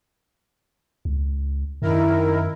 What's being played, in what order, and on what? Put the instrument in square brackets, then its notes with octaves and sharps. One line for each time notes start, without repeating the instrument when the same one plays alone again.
[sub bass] C#2
[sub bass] F#2 [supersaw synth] D#3 E4 A#4